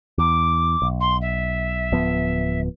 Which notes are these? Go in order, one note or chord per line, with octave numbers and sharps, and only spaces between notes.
E2 D6
B1
C6
E5
D1 F3 B3